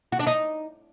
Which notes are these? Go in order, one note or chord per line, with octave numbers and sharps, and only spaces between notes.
F#4
D4
D#4